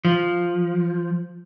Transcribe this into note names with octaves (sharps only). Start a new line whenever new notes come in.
F3